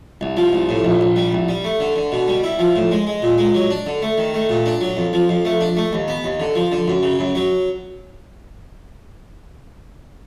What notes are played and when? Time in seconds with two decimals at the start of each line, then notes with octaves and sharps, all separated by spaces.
0.21 C2
0.37 F3
0.53 C2
0.69 A2
0.85 A#1
1.01 A#1
1.16 G3
1.33 C2
1.48 G3
1.64 A3
1.80 D3
1.96 D3
2.12 B2
2.28 G3
2.44 E4
2.59 F3
2.76 A2
2.91 G#3
3.07 G#3
3.22 A#2
3.38 G#3
3.54 F#3
3.71 D4
3.86 D3
4.02 A3
4.18 D#3
4.34 A3
4.49 A#2
4.66 D4
4.81 F#3
4.97 F2
5.13 F3
5.29 F2
5.45 A3
5.61 D4
5.77 A3
5.93 D#2
6.08 B3
6.24 D#2
6.40 D3
6.55 F3
6.72 D3
6.88 F#2
7.03 C#3
7.19 F#2
7.35 F#3